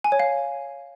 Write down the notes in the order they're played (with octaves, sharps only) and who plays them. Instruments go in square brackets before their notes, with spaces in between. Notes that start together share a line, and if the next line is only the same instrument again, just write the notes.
[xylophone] G#5
C#5
F5